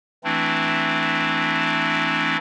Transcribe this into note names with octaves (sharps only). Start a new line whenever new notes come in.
E3 A3 C4 D4 E4